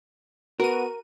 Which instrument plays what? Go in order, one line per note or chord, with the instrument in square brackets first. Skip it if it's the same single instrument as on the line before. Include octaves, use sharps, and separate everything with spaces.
[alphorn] B3 [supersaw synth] F#4 D#7 [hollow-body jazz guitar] A#4